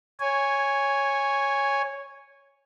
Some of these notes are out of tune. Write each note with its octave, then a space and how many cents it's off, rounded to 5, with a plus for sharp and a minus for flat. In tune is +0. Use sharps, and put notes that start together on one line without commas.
C#5 +0 G#5 -10